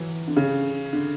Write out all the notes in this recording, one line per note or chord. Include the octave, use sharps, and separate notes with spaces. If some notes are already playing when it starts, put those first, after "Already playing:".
Already playing: E3 F#3
D3
C#3
D3